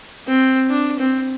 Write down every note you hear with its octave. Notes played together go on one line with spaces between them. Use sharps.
C4
D4
C4